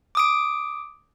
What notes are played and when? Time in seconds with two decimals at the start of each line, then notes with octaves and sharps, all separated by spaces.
0.15 D6 D#6 D7